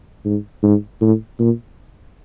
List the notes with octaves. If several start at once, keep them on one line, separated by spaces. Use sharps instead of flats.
G#2
G#2
A2
A#2